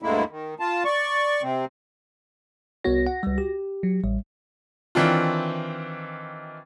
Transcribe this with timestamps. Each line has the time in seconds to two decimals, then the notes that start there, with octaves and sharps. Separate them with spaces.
0.02 D2 G2 D3 G#3 A#3 E4
0.30 D#3
0.60 F4 A5
0.85 D5 C#6
1.42 C3 C4
2.84 C2 B3 F#4 C#5 A#6
3.07 F#5
3.23 C#2 G3
3.38 G4
3.83 F#3
4.04 A1 G3
4.95 D#3 E3 C4 D4 F4